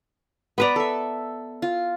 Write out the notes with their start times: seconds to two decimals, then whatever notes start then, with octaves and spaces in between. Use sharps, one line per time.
0.58 B3 B4 D5 A#5 B5
0.76 A4 E5
1.62 F4